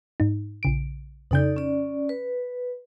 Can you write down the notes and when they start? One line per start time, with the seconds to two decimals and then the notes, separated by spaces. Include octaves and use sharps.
0.20 G#2 D#4
0.63 A#1 C#3 D7
1.31 F2 C#3 D#4 A4 D5 G6
1.56 C#4 D5
2.09 B4